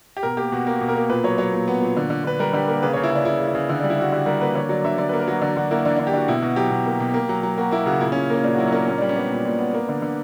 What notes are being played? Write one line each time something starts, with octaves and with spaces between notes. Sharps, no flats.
G4
B2 A#4
A#3 G4
B2 F#4
A#3
B2
A#4
A#3
A#2 B4
F#3 C#5
F#3 C#5
A#2
B3
A#2
D3
D3
D3 B4
G3 A#4
D3 G4
A#3 A#4
C#3 B4
C#5
C#3
E4
C#3 D4
C#3 E4
C#3
E4
C#3
D3 E4
D4
G3
E4
G3 F#4
D3 G4
G3 A#4
A#3 B4
D3 C#5
F#3 D5
D3 E5
D3 D5
B4
A#3
A#4
F#3 F#4
D3 D4
D3 F#4
A#3 E4
D3 D4
D4
D3
G4
D3 F#4
B2 E4
B2 F#4
F#3 G4
B2
A#3
B2
A#3
F#3
F#3
A#3 F#4
A#3 E4
C#3 F#4
A#2 E4
C#4
A#2
A#3 C#4
A#2 D4
F#4
F#3 E4
C#4
A#3 D4
A#2 C#4
D4
G3
C#4
B3 D4
A#2
A#2
B3
A#3
D3
D3